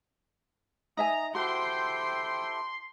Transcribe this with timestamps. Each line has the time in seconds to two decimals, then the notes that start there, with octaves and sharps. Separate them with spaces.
0.97 D#4 E5 G#5 A#5 D#6
1.35 E4 F#4 G4 A4 C5 G5 C6